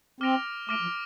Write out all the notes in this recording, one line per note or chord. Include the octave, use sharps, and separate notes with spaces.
C4 D6 F6 A#6 D7 F7
A3 D6 F6 A#6 D7 F7
F3